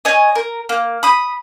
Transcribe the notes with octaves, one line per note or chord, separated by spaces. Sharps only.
C#5 D#5 G#5
A#4
A#3
B5 D#6